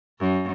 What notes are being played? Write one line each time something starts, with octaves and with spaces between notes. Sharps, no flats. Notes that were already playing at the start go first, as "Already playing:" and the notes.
F#2